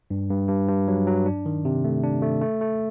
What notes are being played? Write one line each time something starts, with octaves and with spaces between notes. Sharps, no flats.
G2
G2
G2
G2
F#3
F#3
D4
D#3
C3
A3
D4
A3
A3
A3